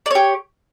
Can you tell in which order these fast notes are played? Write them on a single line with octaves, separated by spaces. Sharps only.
D5 C#5 G4